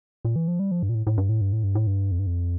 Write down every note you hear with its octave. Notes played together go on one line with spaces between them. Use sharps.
A#2
E3
F3
G3
F3
G2
A#2
A2
A2
G2
A2
G2
A2
G2
A2
G2
F2
G2
F2